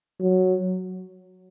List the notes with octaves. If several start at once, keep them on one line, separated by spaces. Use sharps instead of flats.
F#3